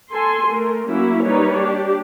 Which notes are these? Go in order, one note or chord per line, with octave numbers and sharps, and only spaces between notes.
A4 G#5 C6
A3 A#4
F#3 A#3 C#4 E4 F#4
G3 A#3 D#4 B4 C#5
D4 G4